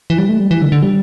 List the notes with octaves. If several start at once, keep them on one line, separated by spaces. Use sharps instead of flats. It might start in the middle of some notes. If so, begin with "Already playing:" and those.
E3
G3
A3
G3
E3
D3
D3
G3